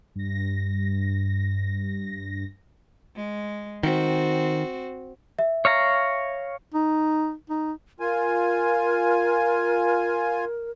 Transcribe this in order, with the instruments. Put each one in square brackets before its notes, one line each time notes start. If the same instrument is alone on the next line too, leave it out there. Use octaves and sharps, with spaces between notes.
[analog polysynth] G2 A#6
[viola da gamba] G#3
[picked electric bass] D#3 [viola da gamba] C4 F#4
[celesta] E5
[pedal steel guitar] C#5 F5 A#5
[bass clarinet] D#4
D#4
[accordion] F4 G#5 [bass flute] A#4